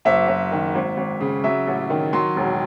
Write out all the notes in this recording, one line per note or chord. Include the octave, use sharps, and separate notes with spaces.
F#1 E5
F#1
D#3
G#1
G#1
C#3
F#3 E5
A1
D#3
F#3 C6
E1